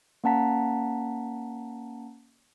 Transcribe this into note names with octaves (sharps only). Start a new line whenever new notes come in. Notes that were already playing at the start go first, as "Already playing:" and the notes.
A#3 C#4 F#5 A5 A#5 B6